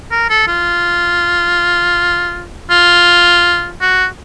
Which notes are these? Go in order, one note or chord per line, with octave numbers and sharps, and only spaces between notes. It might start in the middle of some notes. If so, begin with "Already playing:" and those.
A#4
A4
F4
F4
F#4